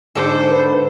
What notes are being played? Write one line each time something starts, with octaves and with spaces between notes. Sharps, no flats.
G#2 D3 A4 C5 D6
B4